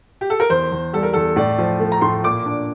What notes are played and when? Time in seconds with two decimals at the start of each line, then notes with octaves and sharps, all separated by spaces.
0.21 G4
0.30 A4
0.40 A#4
0.50 E2 C5
0.72 E2
0.93 G3 A4
1.03 A#4
1.13 E2 A4
1.36 A2 D5
1.59 F3
1.80 A3
1.92 A#5
2.01 A2 C6
2.23 A#2 D6
2.46 D4